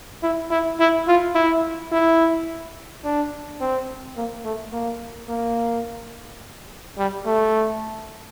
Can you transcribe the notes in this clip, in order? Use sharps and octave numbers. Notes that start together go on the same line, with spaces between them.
E4
E4
E4
F4
E4
E4
D4
C4
A#3
A3
A#3
A#3
G3
A3